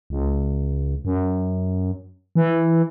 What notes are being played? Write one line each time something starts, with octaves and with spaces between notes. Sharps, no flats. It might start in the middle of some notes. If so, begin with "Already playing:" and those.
C#2
F#2
E3